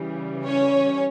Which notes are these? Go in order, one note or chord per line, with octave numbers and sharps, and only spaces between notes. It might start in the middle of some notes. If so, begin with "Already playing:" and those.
Already playing: C#3 E3 G3
C#4 C#5